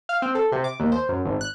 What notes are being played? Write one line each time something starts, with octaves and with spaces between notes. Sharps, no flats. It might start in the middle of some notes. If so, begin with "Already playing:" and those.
F5
C4
A4
C3
D6
D#2
C5
F#2
G#1
F#6